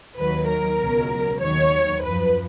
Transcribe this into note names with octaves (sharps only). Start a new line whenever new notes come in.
D#2 D#3 F#3 B4
A#4
C#2 B2 F#3
D#2 D#3 F#3 C#5
F#2 F3 B4